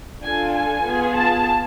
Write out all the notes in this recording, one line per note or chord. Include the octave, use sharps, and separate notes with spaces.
D4 F4 A4 G#5
G#5
B3 F4 G#4
A5